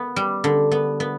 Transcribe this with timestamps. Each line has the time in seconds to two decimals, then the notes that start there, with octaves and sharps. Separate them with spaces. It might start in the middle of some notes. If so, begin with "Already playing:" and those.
Already playing: B3
0.16 G3
0.44 D3
0.71 B3
1.00 B3